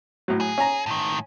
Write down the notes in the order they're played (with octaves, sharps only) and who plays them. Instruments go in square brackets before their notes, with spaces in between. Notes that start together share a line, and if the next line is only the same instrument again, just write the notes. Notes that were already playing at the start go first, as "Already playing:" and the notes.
[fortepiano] A2 F#3
[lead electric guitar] G#4
[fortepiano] C#4 A#5
[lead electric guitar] A2 D#3